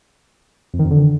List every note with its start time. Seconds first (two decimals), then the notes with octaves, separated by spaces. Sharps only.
0.74 F2
0.79 D#3
0.85 F2
0.91 D3